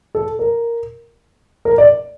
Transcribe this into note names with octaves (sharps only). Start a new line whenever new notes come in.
A4
A#4
A#4
D5